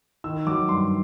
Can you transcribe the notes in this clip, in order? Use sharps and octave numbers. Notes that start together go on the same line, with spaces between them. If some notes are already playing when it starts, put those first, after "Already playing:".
D#3 E6
F#3 D6
G2 C6